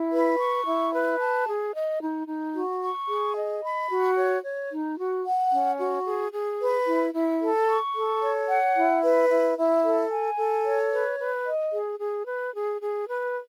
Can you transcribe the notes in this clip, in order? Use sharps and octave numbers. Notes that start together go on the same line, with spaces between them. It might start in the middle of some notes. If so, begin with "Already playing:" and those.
Already playing: E4
B4
C#6
E4
B4
A5
G#4
D#5
D#4
D#4
F#4
C#6
G#4
D#5
B5
F#4
C#5
C#5
D#4
F#4
F#5
C#4
F#4
G#4
G#4
B4
E4
E4
A4
C#6
A4
C#5
F#5
E4
B4
E4
E4
A4
G#5
A4
C#5
B4
B4
D#5
G#4
G#4
B4
G#4
G#4
B4